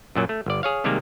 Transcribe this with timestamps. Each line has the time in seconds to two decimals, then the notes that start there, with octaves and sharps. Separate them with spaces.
0.15 F#2 A#2 F#3
0.29 A3
0.46 G1 D5
0.63 G#4 C#5 F5
0.84 C3 D#3 G3 G#3 A#3